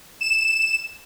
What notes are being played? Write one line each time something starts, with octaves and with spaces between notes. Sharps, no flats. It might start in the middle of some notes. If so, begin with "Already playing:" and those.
E7